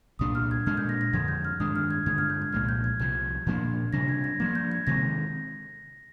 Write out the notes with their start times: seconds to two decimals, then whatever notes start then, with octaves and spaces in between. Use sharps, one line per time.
0.19 C2 A#2 G3 D4 D#6
0.35 F6
0.51 G#6
0.66 A#2 G#3 D4 F6
0.77 G6
0.89 A#6
1.01 A#6
1.13 F2 D3 F3 G#6
1.28 G6
1.45 F6
1.60 G2 D#3 G#3 D4 D#6
1.76 F6
1.91 G#6
2.06 G2 D3 G#3 D4 G#6
2.18 F6
2.30 G6
2.42 G#6
2.53 C2 A#2 F3 G#3 F6
2.69 G6
2.84 G#6
3.00 C2 C3 F3 G#6
3.46 A#2 F3 A#3 D4
3.93 C3 G3 D4 A#6
4.09 G#6
4.24 A#6
4.40 G2 F3 A#3 G#6
4.55 G6
4.72 G#6
4.87 C3 D#3 G#3 C4 A#6